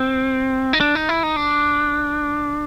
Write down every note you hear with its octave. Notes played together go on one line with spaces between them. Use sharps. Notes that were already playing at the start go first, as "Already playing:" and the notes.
Already playing: C4
D#4
D4
D#4
E4
D#4
D4